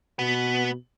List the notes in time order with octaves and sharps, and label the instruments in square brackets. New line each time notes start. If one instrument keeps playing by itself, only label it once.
[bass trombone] B2 [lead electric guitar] B3